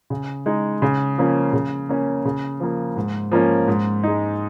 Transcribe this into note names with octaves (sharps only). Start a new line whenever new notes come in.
C#3
G#3 D#4
C#3
F3 A#3 C#4
C#3
A#3 C#4
C#3
F3 A#3
G#2
F3 A#3 C#4
G#2
G#3 D#4